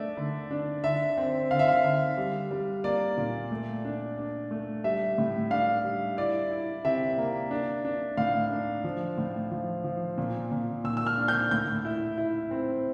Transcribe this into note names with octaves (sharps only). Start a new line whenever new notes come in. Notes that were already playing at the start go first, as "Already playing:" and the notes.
Already playing: A3 D4 D5 E5
D3
D4
D3 E5
C4
D3 F5
E5
F5
D3
G3
G3
A#3 D5
A#2
A3
D4
D4
A3
G3 E5
A2
D4 F5
G3
E4 D5
E4
C3 E5
A#3
D4
D4
A2 F5
D4
F3
A2
F3
F3
A#2
A#2
A#2 E6
E6
F6
D4
G6
A2 G6
E4
E4
C4